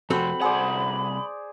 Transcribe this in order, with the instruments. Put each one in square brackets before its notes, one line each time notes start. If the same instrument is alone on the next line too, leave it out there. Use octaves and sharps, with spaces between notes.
[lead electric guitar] F2 C3 [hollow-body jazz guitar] C4 F#4 A4 [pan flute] B5
[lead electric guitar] C2 F#5 [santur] G#4 C5 D5